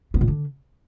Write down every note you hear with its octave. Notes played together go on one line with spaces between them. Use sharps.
B3
A#2
D3